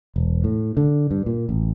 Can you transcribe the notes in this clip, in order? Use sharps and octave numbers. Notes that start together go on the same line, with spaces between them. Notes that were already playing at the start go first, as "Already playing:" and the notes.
E1
A2
D3
G2
A#2
A1